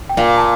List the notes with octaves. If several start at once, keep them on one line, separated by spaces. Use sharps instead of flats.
G5
A#2 F5
A5